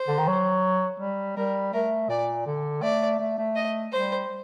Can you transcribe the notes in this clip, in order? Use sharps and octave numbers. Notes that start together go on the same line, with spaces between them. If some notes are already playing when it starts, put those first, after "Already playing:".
Already playing: C5
D3
D#3
F#3
G3
G3 A#4
A3 A#4
A#2 D5
D3
A3 D5
A3
A3
D#5
G3 C5